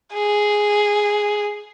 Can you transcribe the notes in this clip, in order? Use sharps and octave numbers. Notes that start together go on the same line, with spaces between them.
G#4